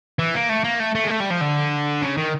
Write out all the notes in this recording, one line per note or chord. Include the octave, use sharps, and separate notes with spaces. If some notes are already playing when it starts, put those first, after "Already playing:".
E3
A#3
A3
A#3
A3
A3
G#3
A3
G3
F3
D3
C#3
D#3